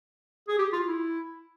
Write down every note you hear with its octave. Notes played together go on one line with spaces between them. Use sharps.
G#4
G4
F4
E4